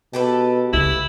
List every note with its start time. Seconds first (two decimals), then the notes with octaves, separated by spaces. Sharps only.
0.13 B2 G4 A4 B4
0.73 C#2 C#3 E4